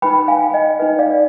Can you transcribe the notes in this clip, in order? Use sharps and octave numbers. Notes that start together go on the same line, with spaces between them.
D#4 B4 G5 B5
F5 G#5
D#5 G5
D#4 B4 D#5
D5 F5